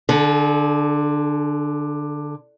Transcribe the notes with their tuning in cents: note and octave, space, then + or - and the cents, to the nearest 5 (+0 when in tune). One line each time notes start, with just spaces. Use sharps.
D3 +10 A4 -45